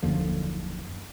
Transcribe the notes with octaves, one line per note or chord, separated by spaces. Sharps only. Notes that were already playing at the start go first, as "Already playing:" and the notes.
F#1 D#2 D3 F3